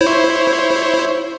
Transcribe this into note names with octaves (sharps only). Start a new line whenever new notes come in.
E4 C5 C#5